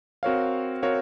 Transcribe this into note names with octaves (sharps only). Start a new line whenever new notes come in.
C4 F#4 A#4 C#5 F5
C4 F#4 A#4 C#5 F5